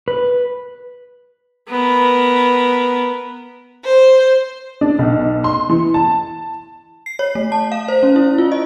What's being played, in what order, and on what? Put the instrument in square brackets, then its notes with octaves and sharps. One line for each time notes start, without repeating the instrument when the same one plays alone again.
[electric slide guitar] B4
[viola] B3 A#4
[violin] C5
[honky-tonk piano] D4
B1
C6
E3
A5
[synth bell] C7
C#5
A3
A5
F5
C5
C#4
E4
F4
D#5